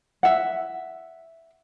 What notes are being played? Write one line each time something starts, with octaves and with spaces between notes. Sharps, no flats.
E5 F#5